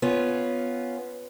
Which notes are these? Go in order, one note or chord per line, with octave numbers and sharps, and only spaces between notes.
B3 C#4 F4